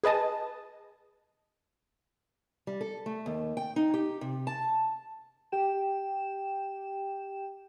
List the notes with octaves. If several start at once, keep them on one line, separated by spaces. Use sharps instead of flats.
G#4 B4 D#5 A5 D#6
G3
A4
A3
D#2
G5
D#4
G4
C3
A5
G4 G5 E7